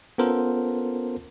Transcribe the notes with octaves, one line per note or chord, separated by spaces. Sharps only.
B3 C#4 F4 A4 A#4 C5